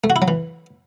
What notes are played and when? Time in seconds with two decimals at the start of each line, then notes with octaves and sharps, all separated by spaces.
0.04 A3
0.10 F#4
0.16 E4
0.22 F#3
0.28 E3